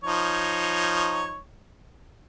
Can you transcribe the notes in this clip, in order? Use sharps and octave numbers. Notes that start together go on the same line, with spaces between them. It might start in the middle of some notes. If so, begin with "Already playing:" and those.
F3 D#4 C#5